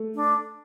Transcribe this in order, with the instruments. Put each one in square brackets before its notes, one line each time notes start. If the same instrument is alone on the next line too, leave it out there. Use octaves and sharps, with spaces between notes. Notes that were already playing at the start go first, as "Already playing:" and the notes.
Already playing: [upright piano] A3
[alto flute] D4